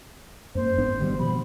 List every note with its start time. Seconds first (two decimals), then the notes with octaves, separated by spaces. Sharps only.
0.55 F#2 A#3 C5
0.78 G#1 B3 D4
1.00 D#3 F#3 G3
1.19 B2 F3 B3 B5